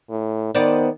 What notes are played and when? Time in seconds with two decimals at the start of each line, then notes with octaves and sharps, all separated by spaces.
0.10 A2
0.55 D#3 B3 C5 D5